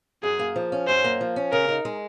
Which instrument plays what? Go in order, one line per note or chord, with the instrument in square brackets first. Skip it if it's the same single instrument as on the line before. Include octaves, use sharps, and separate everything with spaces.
[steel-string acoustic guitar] F#2 [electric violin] G#4
[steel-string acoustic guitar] A#3
F3
C#4
[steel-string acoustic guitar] F#2 [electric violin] C5
[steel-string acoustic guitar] A#3
F3
C#4
[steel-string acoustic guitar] C#3 [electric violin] A#4
[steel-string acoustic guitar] D#4
G#3